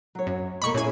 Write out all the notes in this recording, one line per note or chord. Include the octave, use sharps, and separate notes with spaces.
F#3 C#5
F#2
B2 G#3 A#3 B5 C#6
A#2 C#4 E4 G#4 G#5